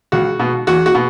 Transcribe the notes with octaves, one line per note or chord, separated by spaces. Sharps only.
C#2 F#4
B2
E2 F#4
F#4
B2